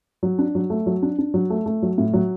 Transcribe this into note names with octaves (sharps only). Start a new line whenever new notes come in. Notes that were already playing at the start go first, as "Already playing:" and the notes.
F#3
D4
F#3
A3
F#3
D4
D4
F#3
A3
A3
F#3
A2
F#3